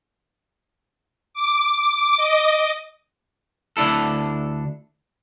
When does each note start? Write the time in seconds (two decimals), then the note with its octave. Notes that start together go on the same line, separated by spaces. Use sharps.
1.34 D6
1.76 D6
2.17 D#5
3.77 D2 D4 E4 A4